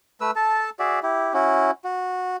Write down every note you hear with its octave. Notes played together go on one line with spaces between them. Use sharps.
A3 B4 E6
A4 A5
F#4 G#4 D5 E5
E4 G4
C#4 E4 F#4
F#4